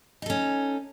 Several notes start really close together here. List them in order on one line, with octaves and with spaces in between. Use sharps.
D#4 A4 C#4